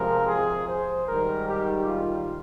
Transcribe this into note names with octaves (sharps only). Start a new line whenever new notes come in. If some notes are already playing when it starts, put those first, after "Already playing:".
Already playing: C3 F3 G#3 A#4
G#4
C5
G#2 D#3 G3 A#4
G4
F4